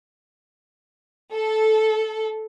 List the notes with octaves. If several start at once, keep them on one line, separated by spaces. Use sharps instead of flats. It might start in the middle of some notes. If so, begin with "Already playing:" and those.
A4